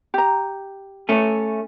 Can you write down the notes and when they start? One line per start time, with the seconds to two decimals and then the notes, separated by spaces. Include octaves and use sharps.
0.14 G4 A#5
1.09 A3 C#4